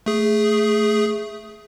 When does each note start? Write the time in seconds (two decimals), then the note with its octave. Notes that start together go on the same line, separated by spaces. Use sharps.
0.06 A3 G#4